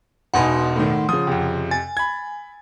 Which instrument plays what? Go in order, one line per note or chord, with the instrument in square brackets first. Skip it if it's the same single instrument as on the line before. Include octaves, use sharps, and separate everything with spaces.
[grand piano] E1 B2 D#4 [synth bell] F#5 C6 [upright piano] G#5 B5
[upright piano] A2 D#3
[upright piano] C#3 F3 [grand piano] D#6
[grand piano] F2 C3
[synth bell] G#5 [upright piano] A6
[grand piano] B5 G#6